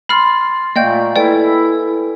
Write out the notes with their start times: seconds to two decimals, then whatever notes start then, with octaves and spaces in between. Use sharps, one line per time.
0.09 B5 C6 F6 A6 C7
0.76 A#2 A3 A#3 D5 D#5 F5 G5 G6
1.16 E4 A4 B4 D5 G5 G#5